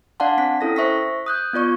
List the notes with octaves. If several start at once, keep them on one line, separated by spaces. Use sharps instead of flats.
D4 D5 F5 F#5 A5 C6
C4 B6
C#4 E4 A4 A#6
C5 E5 C#6 A#6 B6
D#6 F#6 G6
B3 F4 D5 C#6